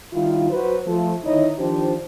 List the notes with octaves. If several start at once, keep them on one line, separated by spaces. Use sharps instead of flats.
D#3 G3 E4 F4
F#3 F#4 B4 C5
F3 A3
D3 D#3 D#4 E4 C#5 D#5
D#3 F3 D4 G4 C5